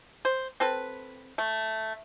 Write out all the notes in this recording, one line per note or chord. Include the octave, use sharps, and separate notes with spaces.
C5
C4 A4 B4
A3